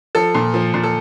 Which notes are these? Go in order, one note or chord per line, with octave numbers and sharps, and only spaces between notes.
F3 A4
A#2
F3
A#2
A4